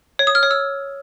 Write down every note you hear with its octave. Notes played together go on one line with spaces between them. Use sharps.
C#5
D#6
F6
C#5
E6